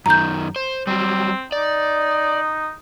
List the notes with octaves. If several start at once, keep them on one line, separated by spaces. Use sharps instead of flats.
F#2 D#3 A#5 G6
C5
F#3 G3 C4
D#4 D5